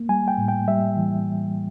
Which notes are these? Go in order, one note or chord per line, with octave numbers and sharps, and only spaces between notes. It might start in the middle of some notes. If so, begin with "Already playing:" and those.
Already playing: A#3
G3 G#5
G5
A2
G5
G3 E5
E3